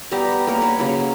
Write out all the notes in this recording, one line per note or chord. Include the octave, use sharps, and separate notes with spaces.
G3 B3 G4 A#5
A#3 A#4 C#5
B4 C#5
C#3 F#3 A#3